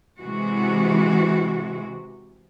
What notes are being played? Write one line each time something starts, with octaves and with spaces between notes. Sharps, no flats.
C3 E3 G#3 F#4